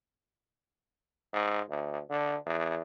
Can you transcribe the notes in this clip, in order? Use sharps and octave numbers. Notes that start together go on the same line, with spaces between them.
G#2
D2
D3
E2